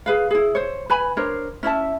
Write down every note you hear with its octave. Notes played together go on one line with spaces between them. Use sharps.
G#4 B4 F5
E4 G#4
C5 C#5
B4 G#5 B5
D4 A#4 C5 C#5
C#4 E4 E5 A5